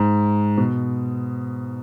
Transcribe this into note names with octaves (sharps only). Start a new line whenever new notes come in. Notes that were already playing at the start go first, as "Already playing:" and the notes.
Already playing: G#2
B2